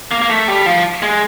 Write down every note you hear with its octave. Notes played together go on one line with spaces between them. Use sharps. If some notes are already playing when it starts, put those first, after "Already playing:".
A#3
A#3
A3
G3
F3
G#3